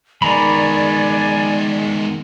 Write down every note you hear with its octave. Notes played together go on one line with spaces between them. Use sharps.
D#3 G#3 B3 D5 G#5 A#5 B5